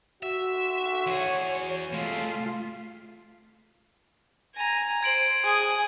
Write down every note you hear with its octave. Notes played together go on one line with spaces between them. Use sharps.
F#4 E5
E2 G#4 C#5
C3 G#3 A3 F4
G#5 A#5
C5 G#6 D7 F#7
G#4 D#6